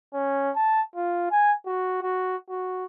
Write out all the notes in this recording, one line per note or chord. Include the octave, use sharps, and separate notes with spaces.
C#4
A5
F4
G#5
F#4
F#4
F#4